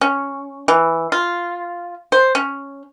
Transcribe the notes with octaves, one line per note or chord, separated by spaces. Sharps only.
C#4
E3
F4
C5
C#4